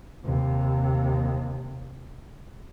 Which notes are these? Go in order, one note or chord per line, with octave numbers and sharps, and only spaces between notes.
D#2 C3